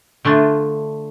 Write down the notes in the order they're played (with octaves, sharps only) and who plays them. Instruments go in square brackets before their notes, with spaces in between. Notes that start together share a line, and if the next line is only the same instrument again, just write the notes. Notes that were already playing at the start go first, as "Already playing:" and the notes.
[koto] D3 A3 D4 F4